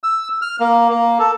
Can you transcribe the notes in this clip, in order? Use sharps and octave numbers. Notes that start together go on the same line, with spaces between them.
E6
F6
A#3
A#3
A4